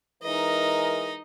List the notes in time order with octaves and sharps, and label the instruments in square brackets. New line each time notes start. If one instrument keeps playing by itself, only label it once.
[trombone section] E3 G#3 A#4 [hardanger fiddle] D#4 D#5